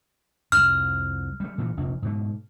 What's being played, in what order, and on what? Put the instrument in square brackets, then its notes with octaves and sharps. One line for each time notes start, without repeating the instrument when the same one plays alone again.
[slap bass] C2 F2 [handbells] F6
[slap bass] G3 A3
A#2 E3 A3
F1 A#1
G#2 B2 A3